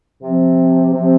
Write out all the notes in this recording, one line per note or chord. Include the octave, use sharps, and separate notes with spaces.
C3 F3 C4
C3 F3 C4